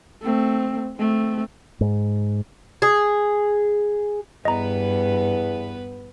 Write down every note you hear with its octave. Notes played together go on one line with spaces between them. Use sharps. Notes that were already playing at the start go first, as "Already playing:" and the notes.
A3 C4
A3 C4
G#2
G#4
E2 G2 B3 B4 D#5 A#5